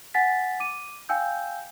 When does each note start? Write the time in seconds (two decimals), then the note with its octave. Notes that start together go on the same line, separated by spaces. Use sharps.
0.14 F#5 G#5 A6 B6
0.60 D6 D#7
1.09 F5 G5 G#5 E6 G6